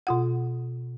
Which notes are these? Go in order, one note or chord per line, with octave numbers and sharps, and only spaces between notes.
B2 F4 F#5